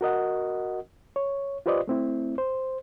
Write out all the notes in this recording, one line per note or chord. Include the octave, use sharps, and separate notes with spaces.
F#4 A#4 D#5 F#5
C#5
F4 G4 B4 C5 D5 D#5
A3 C4 E4
C5